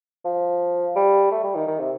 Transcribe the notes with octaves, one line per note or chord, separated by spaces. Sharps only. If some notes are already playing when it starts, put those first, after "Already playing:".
F3
G3
A3
G3
D#3
D#3
C3